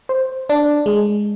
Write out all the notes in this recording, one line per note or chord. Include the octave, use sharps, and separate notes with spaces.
C5
D4
G#3